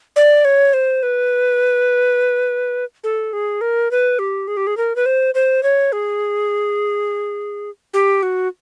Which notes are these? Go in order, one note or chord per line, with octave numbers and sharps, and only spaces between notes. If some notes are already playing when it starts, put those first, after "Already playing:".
D5
C#5
C5
B4
A4
G#4
A#4
B4
G4
G#4
G4
G#4
A#4
B4
C5
C5
C#5
G#4
G4
F#4